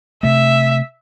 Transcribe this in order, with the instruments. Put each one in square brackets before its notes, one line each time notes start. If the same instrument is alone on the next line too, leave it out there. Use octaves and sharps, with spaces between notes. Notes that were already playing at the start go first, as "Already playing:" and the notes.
[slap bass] C3 A3 [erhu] E5